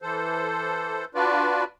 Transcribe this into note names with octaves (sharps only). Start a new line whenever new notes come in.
E3 A4 C5
D4 F4 F#4 B4 D5